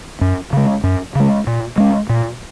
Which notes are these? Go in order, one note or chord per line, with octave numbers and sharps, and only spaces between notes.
F#2
C#3 G#3
F#2
C#3 G#3
A#2
G#3 C#4
A#2